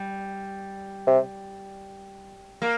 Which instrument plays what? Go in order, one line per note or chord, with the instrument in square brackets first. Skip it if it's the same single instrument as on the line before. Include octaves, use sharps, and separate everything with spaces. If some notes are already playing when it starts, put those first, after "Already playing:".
Already playing: [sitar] G3
[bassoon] C3
[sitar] A#3